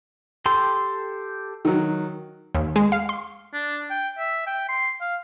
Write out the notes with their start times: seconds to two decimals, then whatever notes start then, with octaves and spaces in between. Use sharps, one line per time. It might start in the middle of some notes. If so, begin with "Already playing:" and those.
0.46 G4 A4 C6
1.65 D#3 F#3
2.55 D#2
2.76 G#3
2.92 F5
3.09 C6
3.54 D4
3.90 G5
4.18 E5
4.47 G5
4.69 C6
5.01 F5